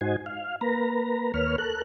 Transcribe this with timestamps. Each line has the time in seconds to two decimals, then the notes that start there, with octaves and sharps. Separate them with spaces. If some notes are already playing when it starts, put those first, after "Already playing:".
0.01 G#2 D#4 F#4 C5 G#5
0.26 F5
0.61 A#3 B4 A#5
1.34 D#2 A#3 B4 C#5 F6
1.58 A4 A#4 F#6